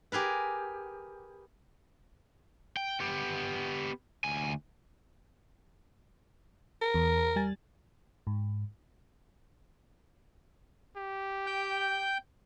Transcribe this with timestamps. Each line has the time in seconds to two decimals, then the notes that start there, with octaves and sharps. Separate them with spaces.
0.12 G4 G#4 A#4 B4
2.77 G5
3.00 B3 G4
4.24 D2 G#5
6.82 A#4
6.94 E2
7.36 G3 G#5 A6
8.27 G#2
10.97 G4
11.47 G5 G6